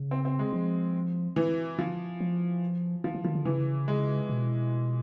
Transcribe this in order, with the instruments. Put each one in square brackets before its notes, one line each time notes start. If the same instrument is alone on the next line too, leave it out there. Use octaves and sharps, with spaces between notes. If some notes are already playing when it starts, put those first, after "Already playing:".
Already playing: [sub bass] C#3
[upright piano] C4
C4
G#3
[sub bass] F3
[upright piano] E3
F3
[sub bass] F3
[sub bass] E3 [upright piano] F3
[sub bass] E3
[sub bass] D#3 [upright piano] F3
[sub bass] D3
[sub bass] C#3 [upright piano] E3
[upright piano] G#3
[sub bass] B2